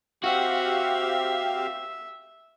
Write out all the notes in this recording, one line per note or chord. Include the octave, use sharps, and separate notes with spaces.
C4 F#4 G4 E5 F5